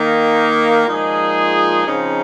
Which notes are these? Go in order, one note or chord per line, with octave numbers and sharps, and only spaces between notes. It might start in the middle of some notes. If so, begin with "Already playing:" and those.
Already playing: D#3 A#3 D#4
A#2 F3 G#3 D#4 G#4
C#3 F3 C4 D#4